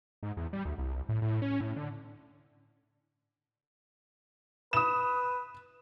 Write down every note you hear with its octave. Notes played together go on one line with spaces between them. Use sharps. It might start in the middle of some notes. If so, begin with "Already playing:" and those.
G#2
E2
G3
D2
C2
A2
A2
C#4
A2
D3
B4 D#6 E7